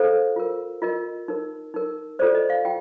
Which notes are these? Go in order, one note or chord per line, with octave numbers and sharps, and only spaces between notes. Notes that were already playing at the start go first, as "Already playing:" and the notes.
Already playing: F4 A4 C5 F5
F4 A#4
F4 A#4 D#5
D#4 A#4
D#4 A#4
F4 A4 C5 D5
D#5
F5
F4 G5